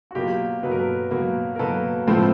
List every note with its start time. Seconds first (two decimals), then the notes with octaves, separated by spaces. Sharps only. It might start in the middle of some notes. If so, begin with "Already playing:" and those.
0.11 F#4
0.15 B2 F#3 A#3 F4 G4
0.63 B2 F#3 A#3 B4
0.71 A#4
0.79 A4 B4
1.11 B2 F#3 A#3
1.56 A#4
1.59 B2 F#3 A#3 A4 B4
2.07 A2 F3 A3 C4